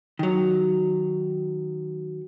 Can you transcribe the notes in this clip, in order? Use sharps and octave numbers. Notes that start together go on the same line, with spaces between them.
D#3 F#3